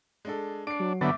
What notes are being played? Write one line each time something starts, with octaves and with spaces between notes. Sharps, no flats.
G#3 D4 A4
D4 C7 D7
F#3
G1 D3 F#3 B3 E5 D6 A6